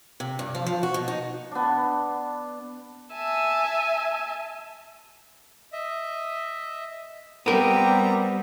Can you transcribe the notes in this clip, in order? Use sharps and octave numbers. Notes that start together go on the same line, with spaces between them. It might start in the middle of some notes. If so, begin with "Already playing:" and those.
C3
G2
F3
F3
F#4
B2
D#4
B3 D4
E5 G#5 A5
D#5 E5
G3 B3 C4 G4 A#4 A#5